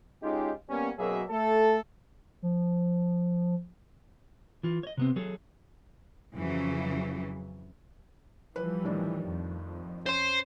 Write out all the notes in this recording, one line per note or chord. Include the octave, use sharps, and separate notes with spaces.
G#3 C#4 D#4 F4 G4
G3 A#3 B3 C#4
F#2 B2 F#3 A#3 G#4 E5
A3 A4
F3
E3 F4
C#5 D#5
C3 B3 C4
F#3 G#4 A4
F2 C#3 E3 F#3
E3 F3 G3 B4
A2 D#3 D4
F2
C#4 C5 C6 E7